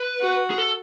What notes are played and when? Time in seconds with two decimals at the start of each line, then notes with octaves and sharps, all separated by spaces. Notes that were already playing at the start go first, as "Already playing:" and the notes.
Already playing: B4
0.21 F#4
0.51 G#4
0.58 A4